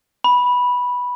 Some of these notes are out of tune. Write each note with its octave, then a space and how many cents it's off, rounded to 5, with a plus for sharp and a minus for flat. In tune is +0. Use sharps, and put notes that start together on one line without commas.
B5 -10